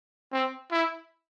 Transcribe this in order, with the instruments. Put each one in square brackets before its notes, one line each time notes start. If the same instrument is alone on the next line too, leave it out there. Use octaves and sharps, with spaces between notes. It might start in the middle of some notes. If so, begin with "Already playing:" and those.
[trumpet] C4
E4